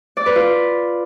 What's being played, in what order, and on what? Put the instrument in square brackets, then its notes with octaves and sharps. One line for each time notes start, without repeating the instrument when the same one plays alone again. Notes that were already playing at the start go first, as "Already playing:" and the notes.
[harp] D5
B4
F4